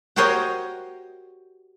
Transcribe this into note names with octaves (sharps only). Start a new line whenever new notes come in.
F#4 G4 A#4 C5 C#5 D#5